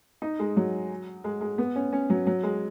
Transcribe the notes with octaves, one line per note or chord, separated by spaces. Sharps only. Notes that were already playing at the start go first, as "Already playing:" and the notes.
D#4
G#3
F#3
G#3
G#3
B3
C#4
C#4
F#3
F#3
G#3